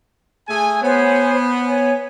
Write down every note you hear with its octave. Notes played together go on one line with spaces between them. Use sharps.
A3 G#4 G#5
B3 C5 C#5 G#5
C#5 G#5